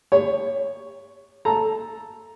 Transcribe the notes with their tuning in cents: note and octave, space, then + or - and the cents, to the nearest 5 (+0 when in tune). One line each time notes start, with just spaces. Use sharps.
G4 +35 C#5 +0
A4 +0 A#5 +0